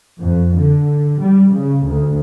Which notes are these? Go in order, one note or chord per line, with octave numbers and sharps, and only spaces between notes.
F2
D3
G3
C#3
D2